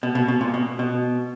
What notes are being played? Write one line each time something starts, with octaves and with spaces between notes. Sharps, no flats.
B2
B2
B2
A#2
B2
B2